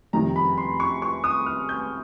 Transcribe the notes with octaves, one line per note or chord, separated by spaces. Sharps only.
F2 C3 D#3 G3 A#5
B5
C6
C#6
C#6
D#6
F6
G6